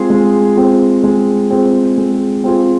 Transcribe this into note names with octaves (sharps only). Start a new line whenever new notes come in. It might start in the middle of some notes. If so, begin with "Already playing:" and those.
Already playing: G#3 C4 F4 G#4
G#3
C4 F4 G#4
G#3
C4 F4 G#4
G#3
C4 F4 G#4